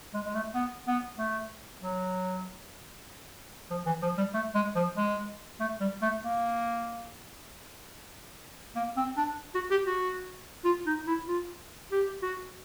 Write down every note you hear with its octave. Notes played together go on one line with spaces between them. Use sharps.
G#3
G#3
A3
B3
B3
A3
F#3
F3
E3
F3
G3
A3
G#3
F3
G#3
A3
G3
A3
A#3
A#3
C4
D4
F#4
G4
F#4
F4
D#4
E4
F4
G4
F#4